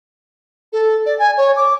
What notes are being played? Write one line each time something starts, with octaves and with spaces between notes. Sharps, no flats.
A4
D5
G#5
C#5
D6